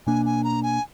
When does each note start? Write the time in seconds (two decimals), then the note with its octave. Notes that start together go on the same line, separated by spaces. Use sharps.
0.07 B2 A#3 D4 G#5
0.26 G#5
0.44 A#5
0.63 G#5